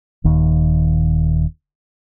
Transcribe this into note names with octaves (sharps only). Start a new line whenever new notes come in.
D#1 D#2